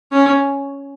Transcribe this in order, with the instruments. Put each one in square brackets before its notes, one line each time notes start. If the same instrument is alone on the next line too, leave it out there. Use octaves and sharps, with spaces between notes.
[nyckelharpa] C#4